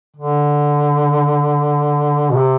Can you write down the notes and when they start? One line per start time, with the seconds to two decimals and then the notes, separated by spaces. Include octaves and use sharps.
0.16 D3
2.30 B2
2.36 C3